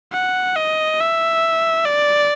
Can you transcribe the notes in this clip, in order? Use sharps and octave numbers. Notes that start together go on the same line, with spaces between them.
F#5
D#5
E5
D5